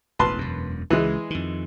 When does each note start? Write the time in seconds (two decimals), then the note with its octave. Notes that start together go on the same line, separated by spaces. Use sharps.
0.19 E1 A1 B4 A5 C6
0.38 E1 F#2
0.90 C#2 E3 G#3
1.30 F2 D#3